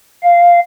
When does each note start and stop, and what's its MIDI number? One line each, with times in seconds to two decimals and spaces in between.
0.23 0.60 77